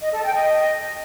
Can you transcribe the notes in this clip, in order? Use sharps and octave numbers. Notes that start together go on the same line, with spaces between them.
D#5
A4
G5
D#5